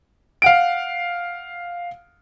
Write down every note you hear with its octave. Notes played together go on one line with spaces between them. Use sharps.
F5 F#5 D7